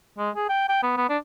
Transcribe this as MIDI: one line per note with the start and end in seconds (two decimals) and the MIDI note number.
0.18 0.30 56
0.36 0.48 68
0.49 0.69 79
0.69 0.82 79
0.83 0.95 59
0.97 1.07 59
1.09 1.18 62